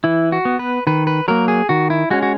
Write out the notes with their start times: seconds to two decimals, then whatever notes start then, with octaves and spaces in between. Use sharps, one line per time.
0.04 E3 E4
0.32 F#4
0.45 B3
0.59 B4
0.87 D#3 B4
1.07 B4
1.28 F#3 A#3 A#4
1.48 G#4
1.69 D#3 F#4
1.90 E4
2.10 G#3 C#4 F#4
2.23 F#4